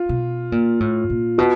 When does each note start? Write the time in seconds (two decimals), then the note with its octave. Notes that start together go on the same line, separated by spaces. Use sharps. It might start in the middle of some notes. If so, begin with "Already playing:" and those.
Already playing: F4
0.09 B2
0.52 A#2
0.80 A2
1.10 A#2
1.38 B2 F#4